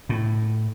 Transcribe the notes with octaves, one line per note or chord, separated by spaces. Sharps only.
A2